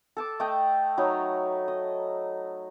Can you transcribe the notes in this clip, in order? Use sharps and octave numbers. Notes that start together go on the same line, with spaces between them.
A4 A5 D6
A3 D#5 G5 A5
F#3 D#4 B5
D#5